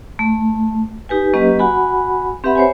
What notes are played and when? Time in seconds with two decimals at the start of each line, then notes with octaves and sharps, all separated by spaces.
0.19 A3
1.09 D#4 G4 B4 G#5
1.34 F#3 A#3 C#4 G4 B4 D#5
1.59 F#4 F#5 G#5 B5
2.44 C4 G4 B4 E5 F#5 B5
2.55 C5 C#5 G#5